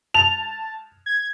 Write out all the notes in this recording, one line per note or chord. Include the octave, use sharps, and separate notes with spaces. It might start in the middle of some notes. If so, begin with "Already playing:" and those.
A5 F7
G#6